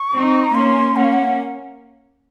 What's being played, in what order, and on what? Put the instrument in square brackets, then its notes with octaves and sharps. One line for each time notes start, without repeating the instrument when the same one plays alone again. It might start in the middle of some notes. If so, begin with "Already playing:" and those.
Already playing: [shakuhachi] C#6
[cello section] C4 D#4
[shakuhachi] A#5
[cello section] A#3 C#4 [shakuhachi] C6
[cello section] A#3 C#4 [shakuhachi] F#5
[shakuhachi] F5
F#5